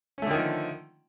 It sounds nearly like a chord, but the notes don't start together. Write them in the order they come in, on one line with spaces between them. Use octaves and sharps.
C#4 A3 D3 D#3 F3